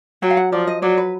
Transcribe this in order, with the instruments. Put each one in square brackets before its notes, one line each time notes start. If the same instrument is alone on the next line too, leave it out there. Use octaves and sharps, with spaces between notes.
[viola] F#3 [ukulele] G5
[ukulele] F5
F#5
[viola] F3 [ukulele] D5
[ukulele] D#5
[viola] F#3 [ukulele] D5
[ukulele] B4